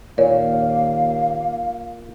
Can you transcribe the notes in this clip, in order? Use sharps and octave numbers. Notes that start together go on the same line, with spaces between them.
D#2 A#2 C#5 F5